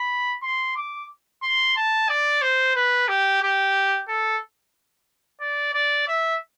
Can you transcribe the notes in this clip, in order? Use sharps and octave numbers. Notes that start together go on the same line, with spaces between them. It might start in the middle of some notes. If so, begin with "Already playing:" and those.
Already playing: B5
C6
D6
C6
A5
D5
C5
B4
G4
G4
A4
D5
D5
E5